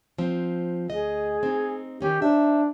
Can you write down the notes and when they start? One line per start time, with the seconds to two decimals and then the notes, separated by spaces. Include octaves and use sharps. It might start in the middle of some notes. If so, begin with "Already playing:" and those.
0.18 F3 C4
0.88 D2 G#4 D#5
1.43 C4 D#4
2.01 D#3 C#4 D#4 G4
2.22 D4 D#4 C5 E5